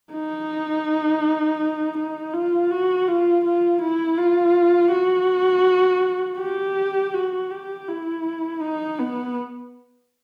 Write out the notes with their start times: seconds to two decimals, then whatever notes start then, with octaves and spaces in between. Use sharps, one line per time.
0.12 D#4
1.97 D#4
2.33 F4
2.70 F#4
3.08 F4
3.44 F4
3.81 E4
4.18 F4
4.92 F#4
6.39 G4
7.14 F#4
7.51 G4
7.88 E4
8.62 D#4
8.99 B3